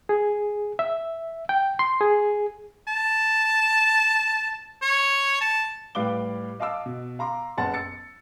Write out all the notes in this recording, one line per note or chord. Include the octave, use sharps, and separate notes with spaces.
G#4
E5
G5
C6
G#4
A5
C#5
A5
A2 G3 B4 F5 D6 G7
D#5 F5 A5 D6 E6
B2
F5 A#5 C6 D6
F#1 B3 F#5 A5 C6 A6
E6 A6 C#7